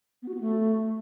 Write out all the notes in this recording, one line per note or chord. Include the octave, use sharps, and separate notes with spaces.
B3
F#4
B3
A3